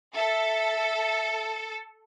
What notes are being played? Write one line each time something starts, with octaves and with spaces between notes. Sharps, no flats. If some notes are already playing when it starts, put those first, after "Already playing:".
A4 E5